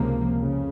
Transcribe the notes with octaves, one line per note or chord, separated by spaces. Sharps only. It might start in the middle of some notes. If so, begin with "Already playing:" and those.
Already playing: C#2 C3 F3 A#3
F2 C#3